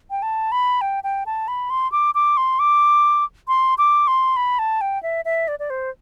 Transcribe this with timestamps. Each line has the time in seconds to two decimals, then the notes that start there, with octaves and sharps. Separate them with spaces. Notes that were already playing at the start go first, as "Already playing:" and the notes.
0.11 G5
0.22 A5
0.52 B5
0.81 G5
1.04 G5
1.26 A5
1.48 B5
1.70 C6
1.92 D6
2.15 D6
2.37 C6
2.59 D6
3.48 C6
3.78 D6
4.08 C6
4.36 B5
4.59 A5
4.81 G5
5.03 E5
5.25 E5
5.48 D5
5.59 D5
5.70 C5